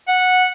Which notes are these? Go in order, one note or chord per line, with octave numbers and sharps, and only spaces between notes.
F#5